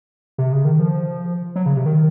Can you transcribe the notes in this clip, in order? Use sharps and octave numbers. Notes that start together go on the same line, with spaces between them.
C3
C#3
D#3
F3
F#3
C#3
C3
D#3